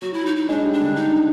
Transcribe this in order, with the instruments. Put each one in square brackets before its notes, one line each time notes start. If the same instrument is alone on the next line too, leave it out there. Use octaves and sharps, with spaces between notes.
[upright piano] F#3 [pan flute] F#4
[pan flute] E4
D#4
D#4
[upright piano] G#3 [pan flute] D4
[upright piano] G3
[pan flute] D4
[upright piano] D3
[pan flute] D#4